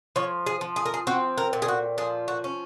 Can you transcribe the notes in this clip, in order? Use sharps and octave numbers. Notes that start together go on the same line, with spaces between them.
F3 C#5
G#4
F3
G#4
A#4
G#4
C4 F#4
A#4
A#2
G#4
F#4
F3 G#4
F#4
C#4